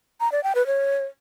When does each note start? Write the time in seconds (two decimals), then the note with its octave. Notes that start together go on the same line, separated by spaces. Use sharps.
0.20 A#5
0.32 D5
0.44 G5
0.55 B4
0.67 C#5